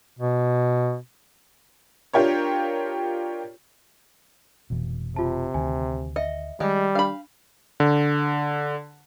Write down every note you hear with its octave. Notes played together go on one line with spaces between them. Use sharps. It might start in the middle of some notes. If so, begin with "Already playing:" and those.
B2
D4 F4 G4 A#4 C#5
F1 B2 E3
C3 F4 A5
D2 D#3 G#5
D#5 E5 C#7
D#3 G3 G#3 G4 D#5
D4 F5 B5
D3